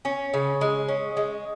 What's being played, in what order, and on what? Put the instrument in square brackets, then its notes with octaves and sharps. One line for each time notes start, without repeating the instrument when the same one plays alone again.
[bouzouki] C#4
C#3
G#3
C#4
G#3